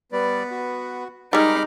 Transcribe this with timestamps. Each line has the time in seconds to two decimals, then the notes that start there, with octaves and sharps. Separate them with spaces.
0.12 G3 B3 B4 D5
0.51 F#4
1.33 G3 G#3 D#4 A#4 B5 D6 F6